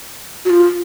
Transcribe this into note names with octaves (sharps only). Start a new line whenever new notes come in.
F#4
F4